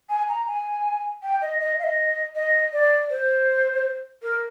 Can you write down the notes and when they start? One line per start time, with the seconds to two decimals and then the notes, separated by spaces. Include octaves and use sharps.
0.09 G#5
0.28 A#5
0.47 G#5
1.23 G5
1.41 D#5
1.59 D#5
1.79 F5
1.83 D#5
2.35 D#5
2.73 D5
3.10 C5
4.22 A#4